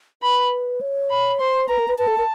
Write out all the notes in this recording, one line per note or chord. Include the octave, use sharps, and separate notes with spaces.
B4 B5
C#5
B5
C5 C6
B4 A#5
A#4
B4
B4 A5
A4
A#4